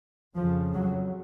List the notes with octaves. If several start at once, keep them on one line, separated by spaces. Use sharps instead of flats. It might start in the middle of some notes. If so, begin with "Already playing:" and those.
F2 C#3 F3
F#3